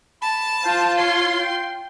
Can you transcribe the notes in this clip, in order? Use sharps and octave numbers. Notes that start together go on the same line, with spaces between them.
A5 B5
F4 C5
C#5 C6
G5